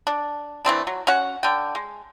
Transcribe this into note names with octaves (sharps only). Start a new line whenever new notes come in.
D4
E3 A3 C4 D4
F#3
C#4 F#4 F#5
D3 G5
G#3